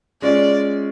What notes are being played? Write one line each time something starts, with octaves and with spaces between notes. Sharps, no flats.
G#3 C#4 F4 D5